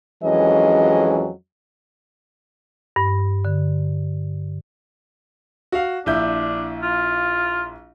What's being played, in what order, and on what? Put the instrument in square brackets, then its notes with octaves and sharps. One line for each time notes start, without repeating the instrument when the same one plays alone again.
[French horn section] F2 E3 F#3 G#3 C#4 D#5
[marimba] G2
D3
[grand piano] F#4 F5
[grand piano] A#1 E4 G6 [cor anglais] D4
[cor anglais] F4